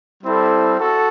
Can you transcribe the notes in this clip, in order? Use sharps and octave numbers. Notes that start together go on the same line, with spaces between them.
G3 C4 E4 A4
F#4 A4